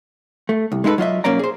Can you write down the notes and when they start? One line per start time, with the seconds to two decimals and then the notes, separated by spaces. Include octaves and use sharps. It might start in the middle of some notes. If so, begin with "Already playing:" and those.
0.49 A3
0.72 C2
0.84 G#3 D#4 E4 A4 B4
0.98 F#3 F4 D#5 E5
1.24 B1 F#3 A#3 C#4 D5 A#5
1.39 G#4 C5